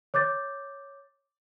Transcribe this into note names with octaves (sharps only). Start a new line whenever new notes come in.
C#5 D6 G6 A6